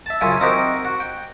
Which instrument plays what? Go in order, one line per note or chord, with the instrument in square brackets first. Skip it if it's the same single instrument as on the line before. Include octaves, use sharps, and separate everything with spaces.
[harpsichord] E5 A5
F#2 C#3 C#4 E4 F4 G#5
C4 D#4 E4 F#4 G4 A#4
F#4
G5